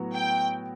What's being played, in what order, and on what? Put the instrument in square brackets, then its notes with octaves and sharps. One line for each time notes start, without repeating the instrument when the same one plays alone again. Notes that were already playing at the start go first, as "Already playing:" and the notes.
Already playing: [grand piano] A2 F#3 B3 F#4
[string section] G5